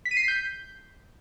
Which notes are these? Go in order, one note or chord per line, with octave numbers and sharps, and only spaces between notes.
B6
D#7
C7
B6
G6